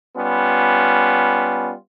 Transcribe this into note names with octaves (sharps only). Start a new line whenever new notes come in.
G3 B3 C#4 F4